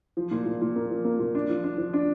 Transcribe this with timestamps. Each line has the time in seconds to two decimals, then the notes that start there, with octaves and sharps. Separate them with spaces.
0.17 F3
0.31 A#2
0.46 A#2
0.61 A#2
0.76 A#3
0.90 F3
1.04 A#3
1.19 A#2
1.35 D4
1.50 F3
1.64 D4
1.78 F3
1.93 D4